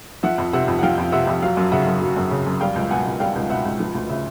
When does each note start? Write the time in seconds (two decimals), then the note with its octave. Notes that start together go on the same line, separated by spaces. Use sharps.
0.23 F3 E5 F#5
0.38 F2
0.53 C3 E5 F#5
0.68 F2
0.79 F#5
0.83 F3 F5 G5
0.98 F2
1.12 C3 E5 F#5
1.27 F2
1.42 F#3 F5
1.57 F#2
1.72 C#3 E5 F#5
1.87 F#2
2.02 F#3
2.16 F#2
2.31 C#3
2.46 F#2
2.61 G3 F5 G5
2.76 C#2
2.91 B2 F#5 G#5
3.05 C#2
3.20 G3 F5 G5
3.36 C#2
3.50 B2 E5 F#5
3.65 C#2
3.80 F3
3.95 D2
4.09 C#3 E5